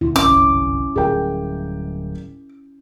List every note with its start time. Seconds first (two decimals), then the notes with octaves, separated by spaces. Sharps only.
0.01 D2 A#2 D#3 E4
0.16 G1 C2 F#2 C#4 D6
0.96 D1 G3 G#4 A#4 G5